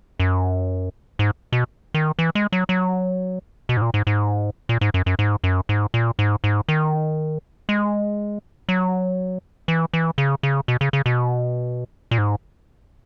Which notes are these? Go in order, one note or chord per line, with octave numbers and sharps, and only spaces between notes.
F#2
G#2
B2
D#3
E3
G#3
F#3
F#3
B2
G#2
A#2
G#2
G#2
A#2
G#2
F#2
F#2
G#2
F#2
G#2
A#2
G#2
G#2
D#3
G#3
F#3
E3
E3
C#3
C#3
B2
C#3
C#3
B2
A#2
G#2